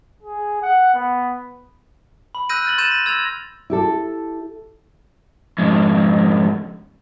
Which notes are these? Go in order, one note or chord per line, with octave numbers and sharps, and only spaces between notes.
G#4
F#5
B3
B5
E6 F#6 G6 A#6 D#7
F6 A6 F#7
C6 G6 A6 D#7 E7
A#6
E6 G#6 A#6 F7
E4 G4 A4
F2 G#2